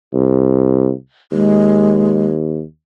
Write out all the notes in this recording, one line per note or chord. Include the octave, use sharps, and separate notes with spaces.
C2
D#2 G#3